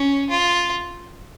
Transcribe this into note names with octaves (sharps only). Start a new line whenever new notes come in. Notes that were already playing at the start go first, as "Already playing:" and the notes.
Already playing: C#4
F4